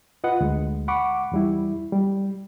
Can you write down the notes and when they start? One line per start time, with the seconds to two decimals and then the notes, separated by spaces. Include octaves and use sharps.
0.24 F4 B4 D#5 F#5
0.41 D2 G#3
0.88 F#5 B5 C#6 D6
1.32 E2 G3 E4
1.92 G3